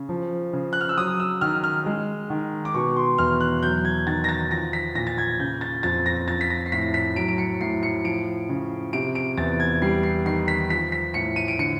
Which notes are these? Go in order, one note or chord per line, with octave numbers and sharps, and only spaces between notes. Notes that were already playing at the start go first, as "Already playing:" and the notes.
Already playing: C#3
F3
C#3
F#6
F6
E6
F#3 D#6
E6
D#3 F6
F6
G#3
D#3
D6
B2 C#6
C6
E2 F6
F#6
F#3 G6
G#6
D#3 A6
A#6
A6
F3 A#6
B6
A#2 A#6
A6
G#6
C#3 G6
A6
F2 A6
A#6
F3 A6
B6
A#6
C7
A2 B6
B6
F#3 D7
D7
C#7
A2 C7
C#7
F3 D7
C#3
C3 D7
D7
E2 A6
G#6
G3 C7
C7
D#3 C7
B6
F3 B6
B6
A2 C#7
D#7
D7
D3 C#7